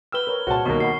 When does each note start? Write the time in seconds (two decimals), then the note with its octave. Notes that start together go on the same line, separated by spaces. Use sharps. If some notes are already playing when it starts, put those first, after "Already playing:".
0.12 B4 G5 E6 F6 G7
0.27 A#4 B4 C#5
0.47 C2 A#2 F#4 G#4 C5 C#5 A5
0.65 C2 B2 D#3 A#3 F#4 C#6
0.80 D#3 F#4 D#5 B5 C7